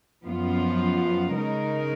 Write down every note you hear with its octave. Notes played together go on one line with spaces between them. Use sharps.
F#2 F3 B3 F4
C#3 G#3 D#4 A#4